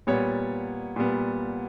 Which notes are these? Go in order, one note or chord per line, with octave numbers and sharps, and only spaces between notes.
A#2 G3 B3 C#5
A#2 G3 B3